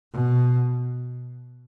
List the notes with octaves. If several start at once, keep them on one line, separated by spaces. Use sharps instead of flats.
B2